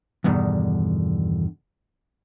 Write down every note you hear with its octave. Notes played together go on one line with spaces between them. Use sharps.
E2 G2 B2 D3 D#3